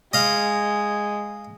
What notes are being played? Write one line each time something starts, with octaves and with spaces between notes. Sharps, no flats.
G#3 D#5 F5